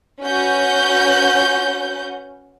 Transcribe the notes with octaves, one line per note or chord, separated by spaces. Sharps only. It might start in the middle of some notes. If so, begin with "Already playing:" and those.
C#4 F#4 B4 F#5 G6